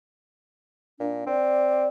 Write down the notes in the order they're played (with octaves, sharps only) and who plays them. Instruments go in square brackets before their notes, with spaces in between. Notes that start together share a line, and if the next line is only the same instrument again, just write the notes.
[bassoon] A#2 [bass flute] D4
[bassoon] C4 [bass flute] D5